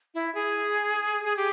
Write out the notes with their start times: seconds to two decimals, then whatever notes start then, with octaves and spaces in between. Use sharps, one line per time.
0.14 E4
0.35 G#4
1.24 G#4
1.37 G4